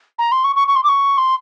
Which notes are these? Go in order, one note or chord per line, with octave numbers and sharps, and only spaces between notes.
A#5
C6
C#6
C#6
C#6
C6
D6
C#6
C6